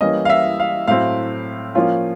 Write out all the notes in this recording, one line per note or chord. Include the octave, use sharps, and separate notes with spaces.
E3 G3 A#3 C#4 D#5
F5
E5
F5
A2 F#3 A3 C4 E4 F5
F3 A#3 C#4 F4